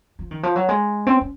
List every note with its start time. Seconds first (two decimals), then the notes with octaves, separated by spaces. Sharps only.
0.19 F3
0.31 D#3
0.43 F3
0.56 F#3
0.69 G#3
1.07 C4
1.21 C#4